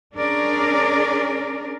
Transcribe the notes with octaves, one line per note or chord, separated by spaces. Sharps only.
C#4 D4 G#4 A#4 D5